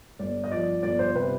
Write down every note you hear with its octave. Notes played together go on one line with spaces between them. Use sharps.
G1 D5
D#5
F3 D5
G1 D5
C5
C3 B4